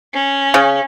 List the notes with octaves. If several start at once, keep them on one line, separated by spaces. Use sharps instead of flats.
C#4
C#3